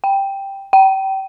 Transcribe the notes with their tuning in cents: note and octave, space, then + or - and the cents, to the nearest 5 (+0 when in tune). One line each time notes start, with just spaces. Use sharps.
G5 +0
G5 -30